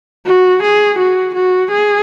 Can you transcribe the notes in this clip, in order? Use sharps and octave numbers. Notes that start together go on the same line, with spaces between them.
F#4
G#4
F#4
F#4
G#4